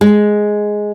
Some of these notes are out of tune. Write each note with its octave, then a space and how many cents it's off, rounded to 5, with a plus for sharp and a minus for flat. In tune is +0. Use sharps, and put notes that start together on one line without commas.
G#3 +5